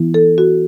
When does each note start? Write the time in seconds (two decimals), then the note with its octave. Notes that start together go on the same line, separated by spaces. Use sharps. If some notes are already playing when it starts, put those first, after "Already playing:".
Already playing: E3 B3 E4
0.14 A4
0.38 F#4